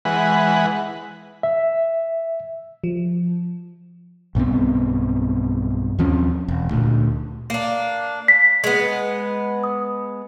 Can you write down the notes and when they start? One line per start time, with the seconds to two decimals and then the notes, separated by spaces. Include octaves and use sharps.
0.05 E3 G#3 B4 F#5
1.43 E5
2.84 F3
4.35 B1 G2 B3 C4
5.99 D#2 F3 C4 C#4
6.48 E1
6.71 D2 A#2
7.50 A#3 D4
8.28 B6
8.64 G#3 B3
9.64 D#6